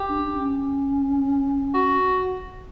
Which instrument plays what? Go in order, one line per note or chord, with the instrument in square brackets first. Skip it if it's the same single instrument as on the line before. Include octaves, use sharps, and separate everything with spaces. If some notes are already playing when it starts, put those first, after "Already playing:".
Already playing: [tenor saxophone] G4
[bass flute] D4
D4
C#4
[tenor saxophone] F#4